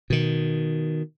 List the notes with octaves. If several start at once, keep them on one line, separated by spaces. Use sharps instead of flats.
B2 D#3